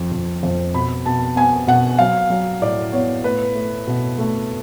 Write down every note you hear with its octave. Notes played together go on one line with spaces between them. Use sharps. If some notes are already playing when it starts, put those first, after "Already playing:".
Already playing: F2 F3
F2
F2
B2 B5
B2 A5
B3 G#5
B2 F#5
F#3 F5
F#3
A2 D5
B3 C#5
A3 B4
A3
B2
A3